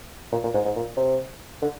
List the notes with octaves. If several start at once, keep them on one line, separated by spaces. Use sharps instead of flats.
A#2
A#2
G#2
G#2
A#2
C3
D3